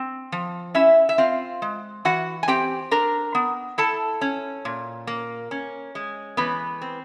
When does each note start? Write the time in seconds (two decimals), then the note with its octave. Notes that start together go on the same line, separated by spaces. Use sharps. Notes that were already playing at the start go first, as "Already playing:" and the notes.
Already playing: C4
0.32 F3
0.74 C#4 E4 E5
1.09 E5
1.18 C4 F4 F5
1.62 G#3
2.05 E3 F#4 F#5
2.43 G#5
2.48 C4 G4 G5
2.91 D4 A#4 A#5
3.35 B3
3.78 E4 A4 A5
4.21 C#4
4.65 A#2
5.07 A#3
5.51 C#4
5.95 G#3
6.37 E3 B3 B4
6.82 C4